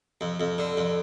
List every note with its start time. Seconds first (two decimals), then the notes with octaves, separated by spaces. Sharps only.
0.21 F2
0.40 F2
0.58 D3
0.77 F2